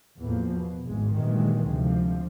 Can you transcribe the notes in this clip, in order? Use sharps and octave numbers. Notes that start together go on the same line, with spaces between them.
E2 A2 F3 A#3
B2
G#1 E2 G#2 G#3
G2 A#2 D#3 E3 F#3 G#3
D2 C3 F3